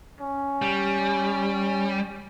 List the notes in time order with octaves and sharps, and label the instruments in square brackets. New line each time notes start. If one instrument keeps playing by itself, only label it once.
[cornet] C#4
[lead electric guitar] G3